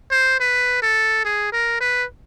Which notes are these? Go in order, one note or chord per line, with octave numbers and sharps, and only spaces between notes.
C5
B4
A4
G#4
A#4
B4